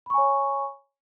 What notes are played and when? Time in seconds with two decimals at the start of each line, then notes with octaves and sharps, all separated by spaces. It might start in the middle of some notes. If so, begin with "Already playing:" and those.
0.06 B5
0.10 C#6
0.14 G#5
0.18 C#5